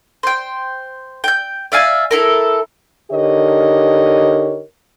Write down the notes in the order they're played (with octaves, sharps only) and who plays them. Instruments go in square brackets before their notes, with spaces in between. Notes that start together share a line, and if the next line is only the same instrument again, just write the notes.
[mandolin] C5 G5
G5 G6
D5 E5 F5 G#5
E4 A4 A#4
[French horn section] D3 D#4 G4 A#4 C#5 D#5